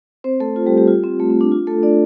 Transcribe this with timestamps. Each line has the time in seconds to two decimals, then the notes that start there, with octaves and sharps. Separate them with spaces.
0.24 C4 C5
0.40 A3 A4
0.56 F4
0.66 G3 G4
0.77 G3 G4
0.88 F4
1.04 C4
1.20 A3
1.30 C4
1.41 D4
1.52 F4
1.67 A3 A4
1.83 D4 D5